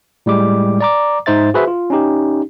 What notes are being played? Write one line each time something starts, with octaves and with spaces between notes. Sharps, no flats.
A2 G3 G#3 D6
D5 A#5 D6
G#2 D#4 C5 E5 A6
F#4 G#4 B4 C5 E5
F4
C#4 D#4 G4